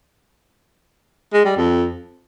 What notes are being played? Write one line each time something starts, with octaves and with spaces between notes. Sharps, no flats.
G#3
G3
F2